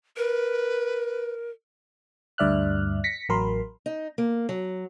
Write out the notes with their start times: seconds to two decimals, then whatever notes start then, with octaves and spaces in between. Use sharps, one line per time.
0.17 A#4 B4
2.38 D2 G2 D5 E5 F6 F#6
3.04 A#6 B6 C#7
3.29 A1 F#3 A#4 B5 C6
3.86 D#4
4.18 A#3
4.49 F#3